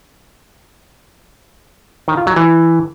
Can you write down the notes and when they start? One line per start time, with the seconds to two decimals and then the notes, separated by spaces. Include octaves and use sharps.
2.08 D#3
2.17 F4
2.27 F#3
2.36 E3